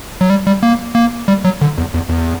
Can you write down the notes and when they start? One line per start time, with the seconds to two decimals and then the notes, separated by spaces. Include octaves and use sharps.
0.21 F#3
0.30 G3
0.47 G3
0.63 A#3
0.95 A#3
1.28 G3
1.44 F#3
1.61 D3
1.78 E2
1.94 E2
2.09 E2